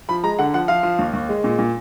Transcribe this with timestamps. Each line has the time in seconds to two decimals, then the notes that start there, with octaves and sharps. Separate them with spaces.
0.09 F3 B5
0.23 G#3 A#5
0.39 D3 F#5
0.53 F3 F#5
0.68 F3 F5
0.83 F3
0.99 D#2
1.13 D#2
1.29 G#3
1.44 A#2
1.59 A#2